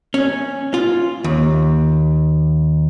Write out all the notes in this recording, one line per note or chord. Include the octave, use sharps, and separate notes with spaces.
C#4
F4
D#2